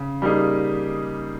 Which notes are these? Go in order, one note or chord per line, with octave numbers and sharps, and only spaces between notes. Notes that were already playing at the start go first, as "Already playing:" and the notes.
Already playing: C#3
G3 A#3 D#4 G#4